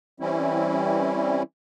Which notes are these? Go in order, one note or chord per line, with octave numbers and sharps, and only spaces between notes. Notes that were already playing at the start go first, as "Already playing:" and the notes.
E3 G3 C4 C#4 E4